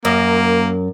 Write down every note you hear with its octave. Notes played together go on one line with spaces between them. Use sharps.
F#2 A#3